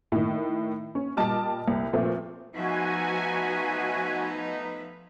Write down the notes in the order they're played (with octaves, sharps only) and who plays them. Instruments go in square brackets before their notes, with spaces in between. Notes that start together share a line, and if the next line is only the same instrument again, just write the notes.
[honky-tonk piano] A2 D#3
C#4
A#2 G3 D#5 A5 D6 F6
C2
A#2 F3 A3 B3 C4
[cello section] F3 B4 E5 [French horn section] A3 B3 D#4 [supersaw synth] F#4 G#5